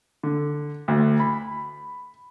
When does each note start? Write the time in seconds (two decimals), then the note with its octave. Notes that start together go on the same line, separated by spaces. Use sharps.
0.23 D3
0.88 D2
1.19 B5